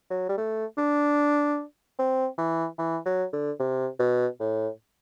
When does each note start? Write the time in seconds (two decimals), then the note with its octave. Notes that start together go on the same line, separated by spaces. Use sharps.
0.10 F#3
0.29 G3
0.37 A3
0.78 D4
1.99 C4
2.38 E3
2.78 E3
3.06 F#3
3.33 D3
3.59 C3
3.99 B2
4.40 A2